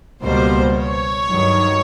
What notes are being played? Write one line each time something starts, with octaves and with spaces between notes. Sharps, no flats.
C#2 B2 G3 A#3 C5
C#5
G2 D#3 F#3